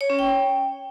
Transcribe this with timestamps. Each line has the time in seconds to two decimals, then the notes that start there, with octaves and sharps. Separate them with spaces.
0.01 C#5
0.10 C#4
0.19 G5